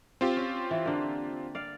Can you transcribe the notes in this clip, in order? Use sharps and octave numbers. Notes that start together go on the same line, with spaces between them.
C4 F4 G4
C#4
E3
D3 A#3
D5 F5